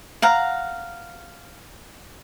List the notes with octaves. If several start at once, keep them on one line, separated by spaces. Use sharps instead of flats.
F5 F#5 A#5